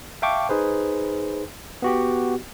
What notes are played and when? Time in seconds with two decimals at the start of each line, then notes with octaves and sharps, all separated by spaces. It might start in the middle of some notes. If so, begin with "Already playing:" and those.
0.22 E5 F5 G5 A5 C#6 D6
0.49 D#4 G#4 B4 C5
1.82 B3 F#4 G4